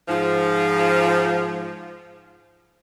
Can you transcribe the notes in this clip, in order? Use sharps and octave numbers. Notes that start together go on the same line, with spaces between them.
G#2 F3